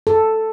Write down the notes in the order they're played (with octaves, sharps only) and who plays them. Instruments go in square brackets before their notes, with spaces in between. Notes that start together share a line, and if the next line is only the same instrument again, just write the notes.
[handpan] A4